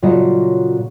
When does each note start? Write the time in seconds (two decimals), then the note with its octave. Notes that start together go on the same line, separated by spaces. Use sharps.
0.02 A#2 C#3 F#3 F4 A4 D#5